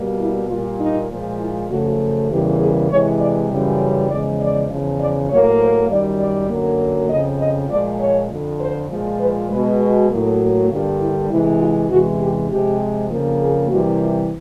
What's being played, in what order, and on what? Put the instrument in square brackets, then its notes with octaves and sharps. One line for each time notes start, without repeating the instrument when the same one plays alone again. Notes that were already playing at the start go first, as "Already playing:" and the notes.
Already playing: [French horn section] B2 G3 A#3
E4
A#2 G3 A#3 F4
D#4
A#2 F3 G#3
E4
F#2 C#3 F3 A3 F#4
E2 C#3 E3 G3 A#3 G4
G#4
C3 E3 G#3 C#5
D5
F#2 C#3 E3 G3
E2 C#3 F3 G#3 D5
D5
E2 C#3 F3
D5
A2 F#3 A#3 C#5
C5
F#2 D#3 G3 D5
D5
F#2 D3 F#3 A#3
F2 C#3 F3 D#5
D#5
A#2 F3 G#3 D5
C#5
F2 D3 F3
C5
A#2 F3 G#3
B4
B2 G#3 B4
F#4
A2 F#3 A#3
G2 D3 G3 A#3 F4
E4
C3 E3 G#3 E4
F4
E2 C3 E3 G#3 F#4
G4
C3 F3 G#3 G4
F2 C#3 F3 A#3
G#4
C3 E3 G3 A#3 F#4
F4